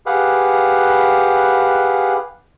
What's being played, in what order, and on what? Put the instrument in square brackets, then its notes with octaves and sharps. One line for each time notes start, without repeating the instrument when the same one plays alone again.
[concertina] G4 G#4 B4 F5 F#5